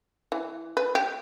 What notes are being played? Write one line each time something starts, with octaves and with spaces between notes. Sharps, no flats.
E3
B4
G4